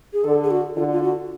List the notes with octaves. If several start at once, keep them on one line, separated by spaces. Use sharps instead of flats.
G#4
D3 A4
G#4
F#4
D3 F4
F4
F#4